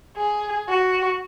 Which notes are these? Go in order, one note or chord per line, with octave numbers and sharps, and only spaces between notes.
G#4
F#4